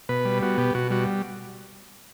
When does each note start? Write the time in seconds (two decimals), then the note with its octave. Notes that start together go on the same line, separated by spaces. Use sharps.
0.09 B2 B4
0.25 G3
0.42 B3 F#4
0.58 B2 G4
0.75 B2 F#4
0.91 G3 F#4